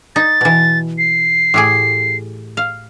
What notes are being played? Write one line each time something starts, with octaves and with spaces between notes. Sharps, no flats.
D#4 A6
B2 E3
C7
A2 G4 G#4
F5